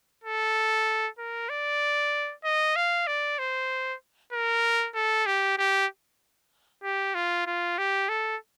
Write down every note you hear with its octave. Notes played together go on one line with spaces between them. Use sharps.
A4
A#4
D5
D#5
F5
D5
C5
A#4
A4
G4
G4
G4
F4
F4
G4
A4